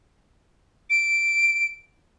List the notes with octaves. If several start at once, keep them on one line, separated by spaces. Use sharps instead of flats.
D7